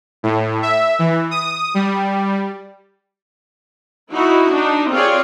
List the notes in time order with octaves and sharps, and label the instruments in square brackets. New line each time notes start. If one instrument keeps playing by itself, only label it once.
[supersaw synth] A2
E5
E3
D#6
G3
[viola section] D#4 E4 F#4
D4 D#4
C4 F4 G4 G#4 C#5 D5